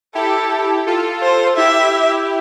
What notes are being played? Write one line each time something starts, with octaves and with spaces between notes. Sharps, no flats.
E4 G4 A4
F4 A4
C5
E4 G4 E5